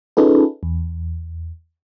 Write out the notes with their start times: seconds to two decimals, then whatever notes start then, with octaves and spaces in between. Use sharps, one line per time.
0.17 C#4 D#4 F4 G#4 A4 B4
0.63 E2